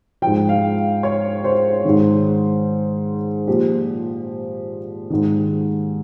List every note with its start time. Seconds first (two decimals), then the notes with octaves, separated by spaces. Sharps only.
0.22 G#2 F3 G5
0.49 F5
1.03 C#5
1.44 C5
1.85 G#2 D#3
3.47 A#2 F3 G4
5.10 G#2 D#3